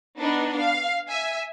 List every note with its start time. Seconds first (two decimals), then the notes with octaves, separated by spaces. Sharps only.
0.19 B3 D4 D#4
0.58 F5
1.09 E5 G#5